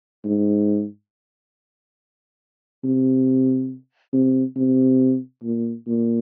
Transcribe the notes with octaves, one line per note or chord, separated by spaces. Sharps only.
G#2
C3
C3
C3
A#2
A#2